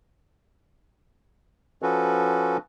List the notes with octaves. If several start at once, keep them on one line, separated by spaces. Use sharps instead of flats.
F3 C#4 F#4 A4 B4